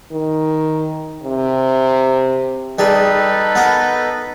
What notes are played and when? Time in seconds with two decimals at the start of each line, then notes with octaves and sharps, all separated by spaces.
0.12 D#3
1.23 C3
2.79 G3 D#4 G#4 A4 B4
3.55 B3 A#4